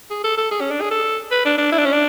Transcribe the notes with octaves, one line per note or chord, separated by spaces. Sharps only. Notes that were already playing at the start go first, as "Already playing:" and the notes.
G#4
A4
A4
G#4
C#4
D4
G#4
A4
B4
D4
D4
E4
D4
C#4
D4